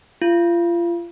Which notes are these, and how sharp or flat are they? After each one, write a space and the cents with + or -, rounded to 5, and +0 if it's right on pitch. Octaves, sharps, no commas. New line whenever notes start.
F4 -30